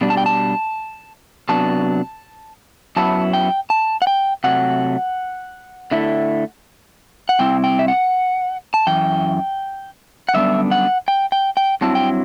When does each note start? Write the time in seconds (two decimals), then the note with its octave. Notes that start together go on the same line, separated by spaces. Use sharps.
0.01 B2 G3 D4
0.10 A5
0.17 G5
0.26 A5
1.49 C3 F#3 B3 D4 A5
2.97 F#2 F#3 B3 E4 A5
3.33 G5
3.70 A5
4.02 F#5
4.07 G5
4.44 C3 F#3 A3 F#5
5.91 D3 A3 E4
7.29 F#5
7.39 C3 G3 C4 E4 G5
7.64 G5
7.79 E5
7.88 F#5
8.74 A5
8.87 F#2 E3 G5
10.29 F#5
10.34 F#2 D3 G3 B3 D4 E5
10.71 F#5
11.08 G5
11.32 G5
11.57 G5
11.81 G2 F#3 C4 E4 A5
11.95 G5